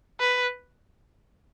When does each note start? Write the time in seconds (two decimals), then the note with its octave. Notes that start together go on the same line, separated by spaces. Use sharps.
0.20 B4